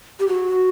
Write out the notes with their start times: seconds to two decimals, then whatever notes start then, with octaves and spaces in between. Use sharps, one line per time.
0.20 G4
0.28 F#4